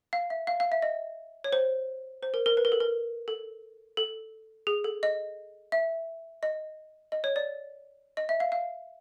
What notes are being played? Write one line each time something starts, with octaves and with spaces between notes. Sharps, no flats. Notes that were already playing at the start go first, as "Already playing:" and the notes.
F5
E5
F5
F5
E5
D#5
C#5
C5
C5
A#4
A#4
B4
A#4
A4
A#4
A4
A4
G#4
A4
D#5
E5
D#5
D#5
C#5
D5
D#5
E5
F5
F5